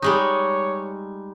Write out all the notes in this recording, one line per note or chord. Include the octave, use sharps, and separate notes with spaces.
G3 G#3 D#4 C#5